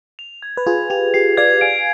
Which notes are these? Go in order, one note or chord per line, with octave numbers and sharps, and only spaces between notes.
F7
G#6
B4
F4 G#4 G#6
G4 F7
G4 C7
D5 F5 G#6
F5 G#5 D7